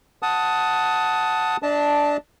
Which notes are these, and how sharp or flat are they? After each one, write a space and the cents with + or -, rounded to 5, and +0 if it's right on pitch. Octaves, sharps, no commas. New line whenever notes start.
F#5 +0 A5 +0 D#6 +15
D4 -5 D#5 +40 A5 +0